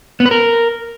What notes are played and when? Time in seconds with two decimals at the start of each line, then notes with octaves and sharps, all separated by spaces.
0.20 B3
0.26 B4
0.31 A#4